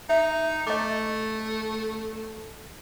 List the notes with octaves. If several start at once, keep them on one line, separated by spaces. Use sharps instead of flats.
D#4 E5
A3 D#5 D6